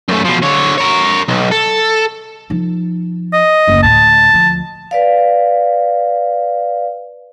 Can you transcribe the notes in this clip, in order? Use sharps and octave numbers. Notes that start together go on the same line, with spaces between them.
F#2 A3
B2 F3
D3 C#5
A#4 C#5
B1
A4
F3 D#4
D#5
F#1 D2
D2 A2 A5
D2 F3
B4 D5 F5